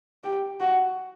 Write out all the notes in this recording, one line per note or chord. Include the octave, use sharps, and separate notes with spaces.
G4
F#4